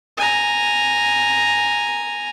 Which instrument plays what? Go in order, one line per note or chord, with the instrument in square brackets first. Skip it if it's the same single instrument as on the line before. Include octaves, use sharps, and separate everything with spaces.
[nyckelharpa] G#5 A#5